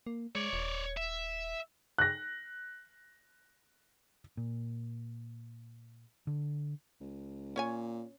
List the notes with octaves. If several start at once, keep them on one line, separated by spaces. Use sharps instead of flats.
A#3
G#3 C#5 D5
D#1
E5
F#6 A#6
A#2
D3
C#2
A#2 C#4 C#5 G#5